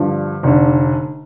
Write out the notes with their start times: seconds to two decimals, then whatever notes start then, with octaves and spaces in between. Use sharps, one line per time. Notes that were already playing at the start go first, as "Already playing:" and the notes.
Already playing: G2 D3 F3
0.43 F1 D3